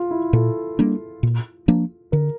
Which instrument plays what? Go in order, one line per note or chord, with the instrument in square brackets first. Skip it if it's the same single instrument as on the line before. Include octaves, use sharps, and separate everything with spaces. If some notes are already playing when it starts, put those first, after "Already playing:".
Already playing: [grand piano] F4
E4
[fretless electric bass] A#2 [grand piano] A4
[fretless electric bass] G3 A#3 D4
A#2
F3 A#3 D4
[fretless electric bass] D3 [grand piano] A#4